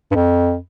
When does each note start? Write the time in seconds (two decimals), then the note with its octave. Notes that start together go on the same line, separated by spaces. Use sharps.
0.11 G2
0.15 F2